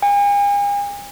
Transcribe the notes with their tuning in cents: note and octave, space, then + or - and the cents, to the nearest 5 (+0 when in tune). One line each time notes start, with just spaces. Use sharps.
G#5 -45